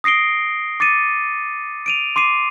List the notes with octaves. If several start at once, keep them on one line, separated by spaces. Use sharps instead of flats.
D#6 A#6 C7 D7 G7
D6 A6 C#7 D#7
D7 D#7 F7
C6 D6 C7 D#7